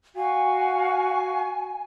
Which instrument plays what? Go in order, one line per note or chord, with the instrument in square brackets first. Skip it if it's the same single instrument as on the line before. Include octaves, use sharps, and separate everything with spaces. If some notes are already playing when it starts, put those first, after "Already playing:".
[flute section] F#4 F5 C#6 [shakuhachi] G#5